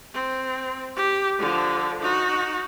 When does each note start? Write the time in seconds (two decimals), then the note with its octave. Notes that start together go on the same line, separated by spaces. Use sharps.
0.14 C4
0.96 G4
1.39 D3 F3
2.01 D#4 F#4